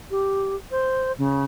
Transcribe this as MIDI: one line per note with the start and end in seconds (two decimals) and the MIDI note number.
0.11 0.56 67
0.71 1.12 72
1.18 1.45 49